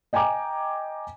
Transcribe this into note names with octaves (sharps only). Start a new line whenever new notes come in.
D#5 G5 G#5 A#5 D6